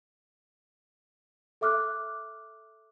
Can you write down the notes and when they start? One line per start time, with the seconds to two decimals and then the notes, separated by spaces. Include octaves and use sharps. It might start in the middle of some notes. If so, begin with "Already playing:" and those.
1.61 A4 E5 D6 F6 F#6